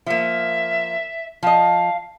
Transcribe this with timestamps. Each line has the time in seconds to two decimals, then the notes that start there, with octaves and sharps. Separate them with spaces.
0.06 F3 A#3 E5
1.43 F3 D#5 F5